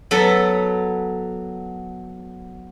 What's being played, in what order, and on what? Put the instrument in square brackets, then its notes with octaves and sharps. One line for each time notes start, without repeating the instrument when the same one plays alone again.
[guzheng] F#3 B3 A4